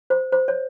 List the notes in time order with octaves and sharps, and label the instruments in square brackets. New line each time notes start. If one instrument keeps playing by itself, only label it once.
[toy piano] C5
C5
C#5